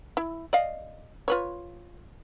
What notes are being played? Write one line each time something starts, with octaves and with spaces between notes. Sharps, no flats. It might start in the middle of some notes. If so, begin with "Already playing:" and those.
E4
D5 D#5 F5
F4 B4 C#5